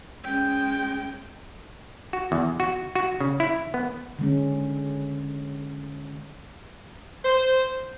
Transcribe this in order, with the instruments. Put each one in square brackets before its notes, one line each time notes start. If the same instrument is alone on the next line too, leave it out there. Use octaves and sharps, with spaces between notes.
[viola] G#3 G5 [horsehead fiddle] C#4
[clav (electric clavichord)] F#4
E2
F#4
F#4
C#3
E4
B3
[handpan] D3 G#3 C#4
[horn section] C5